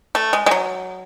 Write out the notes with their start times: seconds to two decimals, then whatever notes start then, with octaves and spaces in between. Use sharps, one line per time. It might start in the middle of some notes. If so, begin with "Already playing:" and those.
0.15 A3
0.33 G#3
0.46 G#3
0.51 F#3